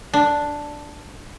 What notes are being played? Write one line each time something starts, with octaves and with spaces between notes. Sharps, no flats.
D4